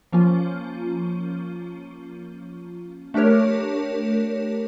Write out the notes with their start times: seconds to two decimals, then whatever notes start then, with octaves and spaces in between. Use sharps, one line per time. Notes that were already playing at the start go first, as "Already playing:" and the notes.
0.13 F3 A#3 C#4 F4
3.14 A3 D4 G4 A#4 C#5